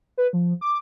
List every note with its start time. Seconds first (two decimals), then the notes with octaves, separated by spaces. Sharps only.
0.17 B4
0.33 F3
0.61 D6